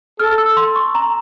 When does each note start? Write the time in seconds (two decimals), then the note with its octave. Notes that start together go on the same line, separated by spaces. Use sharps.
0.20 A4 F6
0.38 E6
0.57 C6
0.76 C#6
0.95 A#5